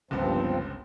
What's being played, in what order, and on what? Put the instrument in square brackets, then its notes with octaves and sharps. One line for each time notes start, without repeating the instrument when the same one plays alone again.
[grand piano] G1 C#2 B3 [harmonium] G2 F3 C4